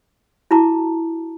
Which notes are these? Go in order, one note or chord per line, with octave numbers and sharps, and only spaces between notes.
E4 F#4 A5 A#5 D6